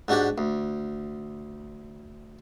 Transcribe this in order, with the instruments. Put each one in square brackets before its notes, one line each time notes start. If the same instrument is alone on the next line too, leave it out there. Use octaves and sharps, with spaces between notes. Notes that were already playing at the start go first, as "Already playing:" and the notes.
[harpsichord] G#2 D4 F#4 G4 D5
D2